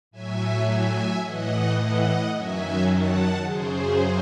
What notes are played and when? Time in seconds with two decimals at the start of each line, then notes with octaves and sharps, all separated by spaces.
0.11 A2 F#3 E5 G#5
0.66 E5 G#5
1.22 A2 E3 D#5 F#5
1.77 D#5 F#5
2.33 F#2 D#3 F#3 E5 G#5
2.88 F#5 A5
3.43 F#2 C#3 F#3 G#4 C5